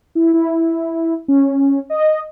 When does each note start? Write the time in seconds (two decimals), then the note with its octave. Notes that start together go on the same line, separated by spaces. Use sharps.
0.15 E4
0.34 E4
1.28 C#4
1.90 D#5